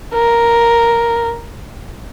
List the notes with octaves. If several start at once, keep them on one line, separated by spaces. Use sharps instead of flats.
A#4